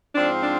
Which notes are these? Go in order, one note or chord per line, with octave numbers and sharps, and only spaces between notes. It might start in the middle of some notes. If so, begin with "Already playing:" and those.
G#2 F3 C4 D4
D4